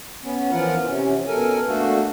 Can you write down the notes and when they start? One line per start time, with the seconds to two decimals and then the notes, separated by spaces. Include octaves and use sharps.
0.23 B3 C#4
0.51 E3 F3 F4 A#4 F#5
0.85 C3 C#4
1.27 B2 A4 A#4 G#5
1.66 A3 A#3 D4 F#4 A4